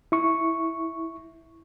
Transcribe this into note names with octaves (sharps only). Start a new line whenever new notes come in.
E4 C#6